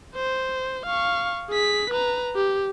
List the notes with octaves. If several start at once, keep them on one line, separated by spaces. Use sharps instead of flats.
C5
F5 C#6
G#4 B6
B4 A#5
G4